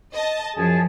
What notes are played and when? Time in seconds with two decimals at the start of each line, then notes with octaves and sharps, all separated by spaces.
0.14 D#5 A5
0.56 F#2 F3 G#4 A5